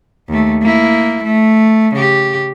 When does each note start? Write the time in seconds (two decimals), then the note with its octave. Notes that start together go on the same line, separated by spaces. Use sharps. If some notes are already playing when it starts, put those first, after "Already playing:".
0.29 D#2 A3
0.62 A#3 E4
1.24 A3
1.95 C#3 G4